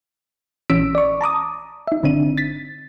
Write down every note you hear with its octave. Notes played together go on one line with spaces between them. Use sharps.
A#1 E3 C#4 E6 B6 D7
D5 C#6
A5 A#5 D6 D#6
D#4 E5
G1 D3 C4 D4 D#7
A6 B6